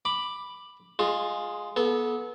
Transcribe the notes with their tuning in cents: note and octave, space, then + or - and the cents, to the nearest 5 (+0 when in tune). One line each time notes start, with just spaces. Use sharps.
B5 +0 D6 +10
G#3 +0 F4 +15
B3 -25 A4 -35